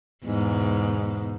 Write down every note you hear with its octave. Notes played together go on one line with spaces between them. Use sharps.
E2 G#2 B2